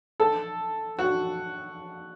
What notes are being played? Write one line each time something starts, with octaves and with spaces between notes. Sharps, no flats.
A4
F#4